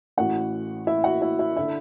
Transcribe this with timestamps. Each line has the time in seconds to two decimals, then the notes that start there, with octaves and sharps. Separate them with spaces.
0.17 A1 A2 E3 F#4 F#5
0.87 E4 E5
1.04 F#4 F#5
1.22 E4 E5
1.39 E4 E5
1.56 D3 E4 E5